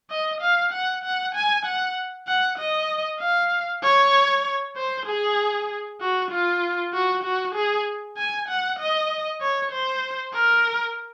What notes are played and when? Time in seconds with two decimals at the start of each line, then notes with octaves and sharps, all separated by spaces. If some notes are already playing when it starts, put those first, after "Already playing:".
0.11 D#5
0.41 F5
0.73 F#5
1.04 F#5
1.35 G#5
1.66 F#5
2.28 F#5
2.59 D#5
3.20 F5
3.84 C#5
4.77 C5
5.07 G#4
6.01 F#4
6.32 F4
6.94 F#4
7.24 F#4
7.55 G#4
8.17 G#5
8.49 F#5
8.80 D#5
9.41 C#5
9.72 C5
10.35 A#4